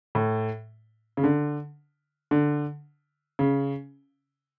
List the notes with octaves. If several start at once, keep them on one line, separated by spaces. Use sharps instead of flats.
A2
C#3
D3
D3
C#3